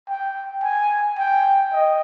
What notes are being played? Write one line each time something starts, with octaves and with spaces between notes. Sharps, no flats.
G5
G#5
G5
D#5